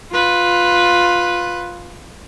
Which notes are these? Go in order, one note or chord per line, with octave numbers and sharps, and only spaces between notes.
F4 B4